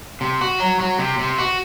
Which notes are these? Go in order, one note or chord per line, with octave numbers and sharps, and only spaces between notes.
C3
F#4
F#3
F#3
C3
C3
F#4